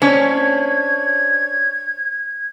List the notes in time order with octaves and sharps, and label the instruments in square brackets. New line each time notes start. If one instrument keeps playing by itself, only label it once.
[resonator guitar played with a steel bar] C#4 [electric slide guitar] D4 C5 C#5 [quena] G#6